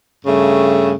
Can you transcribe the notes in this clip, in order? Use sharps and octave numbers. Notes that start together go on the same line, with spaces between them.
G2 C#3 A3